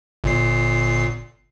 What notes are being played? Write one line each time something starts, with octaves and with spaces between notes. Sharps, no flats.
G1 A#2 C7